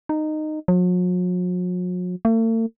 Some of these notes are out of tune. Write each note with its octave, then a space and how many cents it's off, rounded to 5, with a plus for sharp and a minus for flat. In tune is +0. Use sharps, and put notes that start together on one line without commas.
D#4 -15
F#3 -45
A3 +45